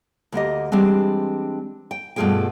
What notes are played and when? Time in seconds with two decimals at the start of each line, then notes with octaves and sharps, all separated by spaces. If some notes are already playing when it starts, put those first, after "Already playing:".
0.32 D2 A#3 G4 D#5
0.72 E3 G3 G#3 C4 D4
1.91 G5
2.16 G2 B2 A3 F4 G#4 G5